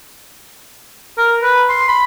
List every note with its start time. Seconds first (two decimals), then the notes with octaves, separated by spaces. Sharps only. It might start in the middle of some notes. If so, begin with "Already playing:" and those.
1.18 A#4
1.42 B4
1.69 C6
1.88 B5